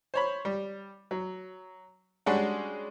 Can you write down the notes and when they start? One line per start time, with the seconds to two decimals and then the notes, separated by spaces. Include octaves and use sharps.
0.14 C5 C#5 B5
0.45 G3
1.11 F#3
2.26 G3 G#3 C#4 D4 F#4